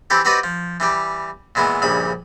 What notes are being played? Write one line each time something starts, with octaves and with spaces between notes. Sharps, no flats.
E3 C4 E4 G4 A4
C4 F#4 G4 B4 D5 D#5
F3
E3 G3 G4
A#2 E3 G#3 B3 E4
A#1 G2 C#3 B5